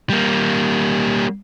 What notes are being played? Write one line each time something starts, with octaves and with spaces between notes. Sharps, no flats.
G3 A#3